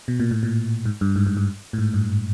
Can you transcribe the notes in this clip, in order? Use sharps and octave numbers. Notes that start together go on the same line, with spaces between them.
B2
A#2
A2
A#2
G#2
G2
G#2
G#2
G2
A2
G#2
G2